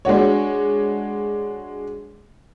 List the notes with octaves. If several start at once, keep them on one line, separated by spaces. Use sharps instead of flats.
G#3 D4 F#4 C#5